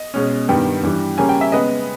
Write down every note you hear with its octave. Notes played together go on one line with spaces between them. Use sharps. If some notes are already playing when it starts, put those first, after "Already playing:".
Already playing: D#5
B2 G#3 C#4
G2 D#3 G3 B3 G5
G2 E3 G3
C#3 G3 A#3 C#4 G#5
G5
E5
C#3 G#3 B3 D#5